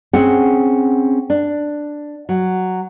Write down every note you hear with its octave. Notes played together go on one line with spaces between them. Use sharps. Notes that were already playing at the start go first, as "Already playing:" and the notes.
C4 C#4 G#4 F#5
D4
F#3